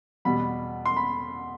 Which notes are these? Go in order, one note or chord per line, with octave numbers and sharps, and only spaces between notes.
E2 B2 G3 B5
C6
B5